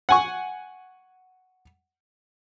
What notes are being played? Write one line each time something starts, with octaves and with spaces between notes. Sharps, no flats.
F#5 G#5 C#6